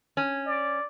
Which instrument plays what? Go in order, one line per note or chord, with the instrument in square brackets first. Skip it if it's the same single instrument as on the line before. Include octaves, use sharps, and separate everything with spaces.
[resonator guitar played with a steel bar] C#4
[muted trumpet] D5